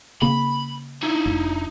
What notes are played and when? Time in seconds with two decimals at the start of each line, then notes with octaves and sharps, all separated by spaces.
0.22 C#3 A#3 C4 B5
1.03 D#4 E4
1.26 F1